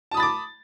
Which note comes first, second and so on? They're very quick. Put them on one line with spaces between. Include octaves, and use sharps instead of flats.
A5 D#6 B5 A6 D6